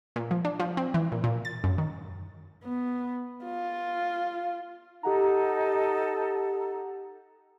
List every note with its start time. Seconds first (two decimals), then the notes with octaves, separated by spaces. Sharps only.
0.16 A#2
0.31 F3
0.45 D4
0.60 F3
0.77 C4
0.94 E3
1.12 A#2
1.24 A#2
1.45 A6
1.64 F#2
1.78 D#3
2.64 B3
3.44 F4
5.03 D#4 G4 A4 F#5 A#5